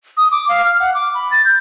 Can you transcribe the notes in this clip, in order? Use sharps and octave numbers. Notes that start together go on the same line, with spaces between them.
D#6
D6
F5
F6
F#5
D6
B5
A6
G6